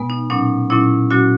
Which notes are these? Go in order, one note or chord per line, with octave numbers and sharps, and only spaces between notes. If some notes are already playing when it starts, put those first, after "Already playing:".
Already playing: B2 G#3 B3
D#4
A#2 F#3 C#4 D#4
A#2 F#3 C#4 E4
A#2 F#3 C#4 F#4